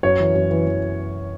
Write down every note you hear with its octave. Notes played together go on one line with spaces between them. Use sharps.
F#2 C#5
E3
F#2
E3
E3